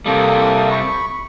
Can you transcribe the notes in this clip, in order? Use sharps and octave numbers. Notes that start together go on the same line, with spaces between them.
C3 G3 A#3 A4 D#6
B5 C#6